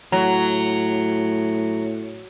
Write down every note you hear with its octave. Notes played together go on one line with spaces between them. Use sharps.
A2 F#3